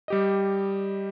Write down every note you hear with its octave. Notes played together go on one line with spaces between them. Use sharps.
G3 G4 D#5